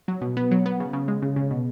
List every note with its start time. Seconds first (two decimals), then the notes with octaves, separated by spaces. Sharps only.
0.08 F#3
0.22 B2
0.37 B3
0.51 F#3
0.66 B3
0.80 C#3
0.93 C#3
1.08 G#3
1.22 C#3
1.36 C#3
1.51 B2